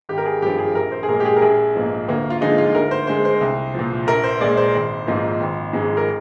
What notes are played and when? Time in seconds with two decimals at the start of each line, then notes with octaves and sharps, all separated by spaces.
0.09 G#1 G4
0.18 A#4
0.25 G#4
0.42 G2 F3 G4
0.58 G#4
0.75 A#1 A#4
0.92 C5
1.03 G#4
1.09 A#2 G#3 A#4
1.20 G4
1.25 G#4
1.36 A#4
1.42 A#1 G#4
1.76 G#2 F3 A#3
2.08 D2 A#3
2.30 F4
2.41 D3 F3 G#3 D#4
2.58 F4
2.74 D2 A#4
2.91 C5
3.07 D3 G#3 C5
3.25 C5
3.41 C2
3.74 A#2 F3
4.07 A#1 A#4
4.24 C5
4.40 A#2 G#3 D5
4.57 C5
4.74 G#1
5.07 G#2 F3 A#3
5.40 G#1
5.73 G#2 F3 G#3
5.97 A#4